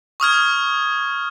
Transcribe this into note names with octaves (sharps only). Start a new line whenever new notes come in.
C#6 D#6 F6 G#6